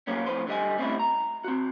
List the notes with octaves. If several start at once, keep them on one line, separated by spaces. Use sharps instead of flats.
A#2 F#3 A#3 B3 C#4
F2 A2 B4 C5
D3 G3 D#5 G#5
G3 A3 C4 C#4 E4 D#5
A#5
C4 F#4